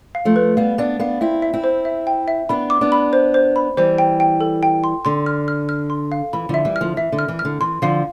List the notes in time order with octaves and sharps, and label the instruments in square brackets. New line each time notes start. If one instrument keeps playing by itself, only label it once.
[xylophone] F5
[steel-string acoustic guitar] F3 A3
[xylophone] B4
[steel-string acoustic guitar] G3 B3 [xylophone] F5
[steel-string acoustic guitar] B3 D4 [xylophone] D5
[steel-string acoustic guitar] B3 D4 [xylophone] F5
[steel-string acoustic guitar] C4 E4 [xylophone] E5
[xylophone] E5
[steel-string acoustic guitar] C4 E4
[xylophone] C5
E5
G5
E5
[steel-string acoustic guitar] B3 D4 [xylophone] B5
[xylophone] D6
[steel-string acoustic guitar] B3 D4
[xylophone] B5
C5
C5
B5
[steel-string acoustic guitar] E3 G3 [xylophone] C5
[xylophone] G5
G5
A4
G5
C6
[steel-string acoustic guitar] D3 [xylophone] C6
[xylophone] F6
F6
F6
C6
F5
[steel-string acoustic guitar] E3 [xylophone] B5
[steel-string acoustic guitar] D3 F3 [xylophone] E5
[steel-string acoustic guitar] E3 G3
[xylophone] F6
[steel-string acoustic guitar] D3 F3
[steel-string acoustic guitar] E3 [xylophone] E5
[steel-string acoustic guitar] D3
[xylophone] F6
[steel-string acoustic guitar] E3
[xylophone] F6
[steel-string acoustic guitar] D3
[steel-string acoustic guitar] E3 [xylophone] C6
[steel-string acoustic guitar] D3 F3 [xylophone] F5